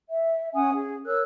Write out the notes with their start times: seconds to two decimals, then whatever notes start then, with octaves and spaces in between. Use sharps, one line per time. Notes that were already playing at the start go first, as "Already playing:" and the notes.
0.08 E5
0.53 C#4 F#5 G#5 D#6
0.72 C#4 G#4
1.05 A#4 C#5 E6 F#6